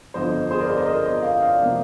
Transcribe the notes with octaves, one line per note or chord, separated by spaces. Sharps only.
G1 F2 D3 F3 C5 D#5
G#4 C5
A#4 D5
C5 D#5
A#4 D5
C5 D#5
C5 D#5
F5
D5 F5
C3 F3 A#3